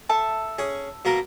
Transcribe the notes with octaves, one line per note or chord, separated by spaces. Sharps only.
A4 E5 A5
C#4 G#4
B2 A#3 A#4